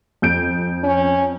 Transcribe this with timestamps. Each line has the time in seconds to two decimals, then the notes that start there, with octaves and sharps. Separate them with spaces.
0.22 F2 G6 D7
0.84 C#4